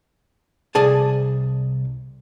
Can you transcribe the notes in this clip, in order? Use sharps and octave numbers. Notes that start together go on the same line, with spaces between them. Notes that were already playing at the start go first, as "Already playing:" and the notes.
C2 G#4 D5 G#5 A5